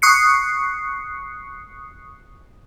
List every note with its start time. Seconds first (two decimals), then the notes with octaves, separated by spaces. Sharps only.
0.02 C#6 D#6 F#6 C7 C#7